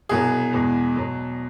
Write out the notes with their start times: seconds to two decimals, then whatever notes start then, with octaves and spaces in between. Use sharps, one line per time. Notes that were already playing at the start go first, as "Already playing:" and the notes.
0.09 C2 B2 F#3 G#4
0.53 E2 B2 G#3
0.96 B2 F#3